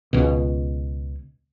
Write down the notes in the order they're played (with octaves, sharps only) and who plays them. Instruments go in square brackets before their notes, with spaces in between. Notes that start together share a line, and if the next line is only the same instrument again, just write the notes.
[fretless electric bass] C#2 B2